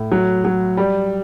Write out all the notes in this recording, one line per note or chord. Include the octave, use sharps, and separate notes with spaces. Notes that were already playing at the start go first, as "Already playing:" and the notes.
Already playing: A2
F#3
F#3
G3